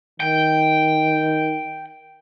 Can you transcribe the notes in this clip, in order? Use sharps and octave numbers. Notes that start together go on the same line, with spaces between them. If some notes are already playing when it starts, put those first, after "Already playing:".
D#3 G5